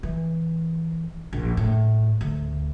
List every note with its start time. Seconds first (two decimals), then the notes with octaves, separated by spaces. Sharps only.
0.03 E3
1.33 A#1
1.57 A2
2.21 D2